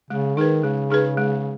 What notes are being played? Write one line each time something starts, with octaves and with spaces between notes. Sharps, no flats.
C#3 G#3
D#3 D#4 G#4 B4
C#3 G#3
D#4 G#4 B4
G#3